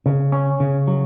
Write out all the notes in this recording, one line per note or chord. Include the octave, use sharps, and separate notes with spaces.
C#3
C#4
C#3
F#3